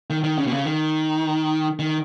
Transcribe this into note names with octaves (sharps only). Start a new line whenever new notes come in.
D#3
D#3
C#3
B2
C#3
D#3
D#3